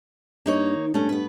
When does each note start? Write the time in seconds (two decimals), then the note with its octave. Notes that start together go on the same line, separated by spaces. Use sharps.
0.46 G2 A#3 D#4 C#5
0.75 D#3
0.94 G2 A3 C#4
1.09 B3 B4